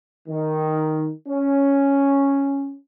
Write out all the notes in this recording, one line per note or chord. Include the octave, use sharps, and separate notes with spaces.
D#3
C#4